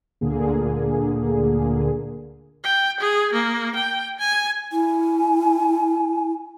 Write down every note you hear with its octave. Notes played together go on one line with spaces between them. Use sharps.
D2 A#2 D3 A#3 G#4
G5
G#4
A#3
G5
G#5
E4 G#5